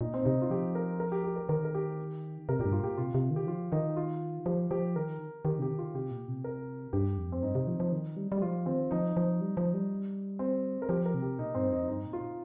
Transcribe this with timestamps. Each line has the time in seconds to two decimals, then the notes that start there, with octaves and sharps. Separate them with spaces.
0.01 A#2 D#4
0.14 C4
0.25 C3 D#4
0.42 F4
0.50 F3 G4
0.75 A#4
1.00 A#4
1.12 G4
1.24 G4
1.36 A#4
1.49 D#3 A#4
1.65 A#4
1.75 G4
2.49 C3 A#4
2.60 G2 A#2 G4
2.72 F4
2.81 A#2 G4
2.98 C3 F4
3.15 C3
3.31 D#3
3.36 G4
3.47 F3 F4
3.72 D#3 D#4
3.97 F4
4.46 F3 G4
4.71 F3 G4
4.96 D#3 A#4
5.45 D#3 G4
5.59 C3 G4
5.70 D#3
5.79 F4
5.94 C3 G4
6.11 A#2
6.28 C3
6.44 A#4
6.93 G2 G4
7.18 F2
7.32 C4
7.42 G2 D#4
7.55 C3
7.67 F3
7.80 F3
7.92 D#3
8.17 G3
8.32 G3
8.38 G4
8.42 F3 F4
8.66 D#3 C4
8.91 F3 D#4
9.17 F3
9.41 G3
9.57 F3
9.74 G3
10.39 C4
10.82 A#4
10.89 F3 G4
11.06 A#4
11.14 C3
11.22 G4
11.39 A#2 D#4
11.55 G2 C4
11.71 F2 D#4
11.88 G2 D#4
12.05 A#2
12.13 F4